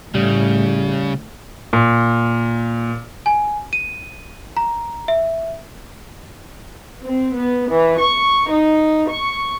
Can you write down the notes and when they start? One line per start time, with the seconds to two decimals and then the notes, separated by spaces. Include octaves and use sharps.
0.15 A2 C#3 G3
1.73 A#2
3.26 G#5
3.73 D#7
4.57 A#5
5.08 E5
7.03 C4
7.35 B3
7.69 E3
7.99 C#6
8.50 D#4
9.10 C#6